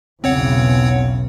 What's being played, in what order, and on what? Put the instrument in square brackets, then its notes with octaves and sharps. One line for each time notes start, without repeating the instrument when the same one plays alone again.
[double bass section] B1 E2 C#3 [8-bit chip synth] C4 C#5 F#5